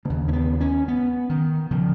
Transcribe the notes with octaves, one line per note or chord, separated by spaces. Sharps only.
D#2 C#3 A#3
C#4
B3
C#4
B3
D#3
C#3 F3